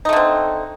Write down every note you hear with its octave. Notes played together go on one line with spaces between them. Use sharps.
D3 A3 C4 D#4